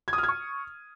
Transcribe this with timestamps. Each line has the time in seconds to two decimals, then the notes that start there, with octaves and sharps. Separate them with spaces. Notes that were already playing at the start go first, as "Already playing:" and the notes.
0.08 G#6
0.13 D#6
0.18 F6
0.23 G#6
0.29 C#6